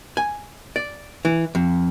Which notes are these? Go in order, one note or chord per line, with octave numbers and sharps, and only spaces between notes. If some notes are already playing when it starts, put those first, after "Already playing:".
G#5
D5
E3
F2